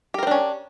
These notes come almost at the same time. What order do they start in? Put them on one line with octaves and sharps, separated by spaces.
G4 A#4 C5 D4 C#4